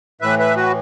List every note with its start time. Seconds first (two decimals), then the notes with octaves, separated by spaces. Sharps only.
0.21 A2 E3 B4 E5
0.39 B4 E5
0.56 F#4 B4